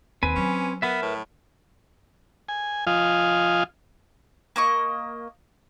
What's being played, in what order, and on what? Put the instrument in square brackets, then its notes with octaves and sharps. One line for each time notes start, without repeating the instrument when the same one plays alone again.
[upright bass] D#2 [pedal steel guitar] C4 B4 G#5
[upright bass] F#3 [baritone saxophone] C#4
[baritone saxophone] B3 [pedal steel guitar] A#4 B4 E5
[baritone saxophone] A2
[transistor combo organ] G#5
F3 F4 D#5 F5 G#5
[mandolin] A#3 D#5 C#6